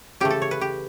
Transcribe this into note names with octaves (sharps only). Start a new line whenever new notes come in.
C#3 E3 A3 G4
A4
C#5
B4
G4